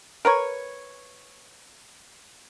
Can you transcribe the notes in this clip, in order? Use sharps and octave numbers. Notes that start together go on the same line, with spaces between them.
A#4 B4 C#5